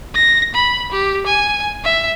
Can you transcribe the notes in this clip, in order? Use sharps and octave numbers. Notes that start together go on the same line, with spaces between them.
A#6
B5
G4
G#5
E5